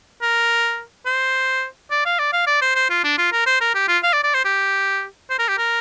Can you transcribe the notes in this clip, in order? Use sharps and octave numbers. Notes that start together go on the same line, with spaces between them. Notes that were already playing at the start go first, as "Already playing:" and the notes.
A#4
C5
D5
F5
D5
F5
D5
C5
C5
F4
D4
F4
A#4
C5
A#4
G4
F4
F5
D5
D5
C5
G4
C5
A#4
G4
A#4